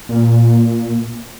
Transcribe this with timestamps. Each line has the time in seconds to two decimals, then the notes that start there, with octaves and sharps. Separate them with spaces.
0.09 A#2